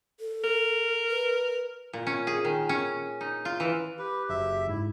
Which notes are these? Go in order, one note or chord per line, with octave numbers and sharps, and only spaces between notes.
A4
A#4
B4
A#2
C#4
G#4
D#3
C#4
D#4
F4
E3
G4 B4
F#1 E5
G#2 E4